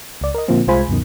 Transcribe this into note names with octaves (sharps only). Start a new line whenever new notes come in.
C#2 D5
A#4 D#5
A#2 D3 F3 A#3 C4
C2 G#3 F4 C5 G#5 B5
C#2 F#2 B2 D#3